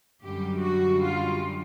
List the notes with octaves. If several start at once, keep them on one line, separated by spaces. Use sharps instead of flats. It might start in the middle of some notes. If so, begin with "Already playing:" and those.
F#2 D3 G3 G4
F#4
F4